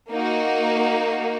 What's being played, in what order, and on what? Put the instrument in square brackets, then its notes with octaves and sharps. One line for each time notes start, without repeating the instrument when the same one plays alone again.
[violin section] A#3 D#4 F#4